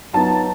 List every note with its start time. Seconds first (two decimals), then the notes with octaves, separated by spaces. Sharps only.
0.13 F#3 B3 D#4 A5